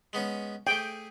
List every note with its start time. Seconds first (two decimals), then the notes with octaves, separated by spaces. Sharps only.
0.13 G#3 B3 C#4
0.67 A3 G#4 G5